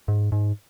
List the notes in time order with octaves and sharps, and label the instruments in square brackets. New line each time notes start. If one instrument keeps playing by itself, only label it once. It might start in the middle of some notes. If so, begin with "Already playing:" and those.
[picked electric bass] G#2
G#2